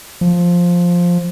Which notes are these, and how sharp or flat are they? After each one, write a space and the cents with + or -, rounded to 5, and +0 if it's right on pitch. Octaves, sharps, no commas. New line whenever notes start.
F3 +5